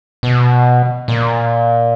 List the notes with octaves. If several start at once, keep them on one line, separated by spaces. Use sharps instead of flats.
B2
A#2